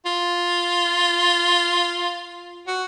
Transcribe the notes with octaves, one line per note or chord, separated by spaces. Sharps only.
F4
F#4